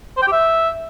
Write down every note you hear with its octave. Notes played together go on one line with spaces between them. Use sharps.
C5
G5
G4
E5